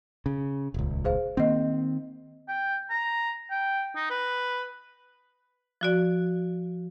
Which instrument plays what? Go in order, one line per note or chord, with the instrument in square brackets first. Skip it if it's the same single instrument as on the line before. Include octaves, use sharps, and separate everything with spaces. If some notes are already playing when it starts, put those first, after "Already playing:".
[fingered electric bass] C#3
D#1 C#2
[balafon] G#4 C5 F5
[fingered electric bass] D#3 C4 [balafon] A#3 D#5
[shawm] G5
A#5
G5
D#4
B4
[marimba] F3 F#4 D5